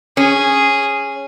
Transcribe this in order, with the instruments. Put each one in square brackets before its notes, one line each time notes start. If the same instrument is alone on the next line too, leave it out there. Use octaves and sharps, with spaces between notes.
[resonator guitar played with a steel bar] C#4 [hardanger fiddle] G#4